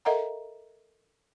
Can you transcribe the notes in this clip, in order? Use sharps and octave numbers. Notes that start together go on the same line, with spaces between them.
A4 A#4 D#5 E5 F#5 A#5